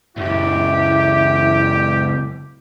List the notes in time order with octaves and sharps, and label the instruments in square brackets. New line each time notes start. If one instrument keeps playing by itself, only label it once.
[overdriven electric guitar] C#2 F#2 [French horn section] E4 [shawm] G4